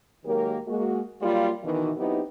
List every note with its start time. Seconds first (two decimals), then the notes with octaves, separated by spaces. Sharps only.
0.25 D#3 F#3 G#3 A#3 G4 A#4
0.67 G#3 A#3 F#4
1.21 F#3 G3 A#3 F4
1.63 B2 D#3 E3
1.97 F#3 B3 C4 D#4 E4 G4